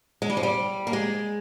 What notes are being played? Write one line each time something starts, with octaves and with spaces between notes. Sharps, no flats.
G#3
G3
F3
G3
A#3
G#3